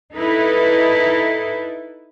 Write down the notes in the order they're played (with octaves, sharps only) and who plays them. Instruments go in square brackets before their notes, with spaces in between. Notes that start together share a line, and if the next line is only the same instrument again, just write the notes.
[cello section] D#4 E4 A4 B4